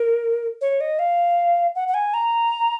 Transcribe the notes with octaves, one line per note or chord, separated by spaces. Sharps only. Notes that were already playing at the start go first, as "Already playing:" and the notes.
Already playing: A#4
C#5
D#5
F5
F#5
F#5
G#5
A#5